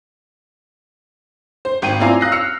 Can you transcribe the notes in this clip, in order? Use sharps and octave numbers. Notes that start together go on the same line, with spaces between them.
C5
G#1 G5 D#7
C4 E4 F4 D5 G#5 A#5
F5 D#6 F#6 A#6 C7
E6 F6 A#6 C7 C#7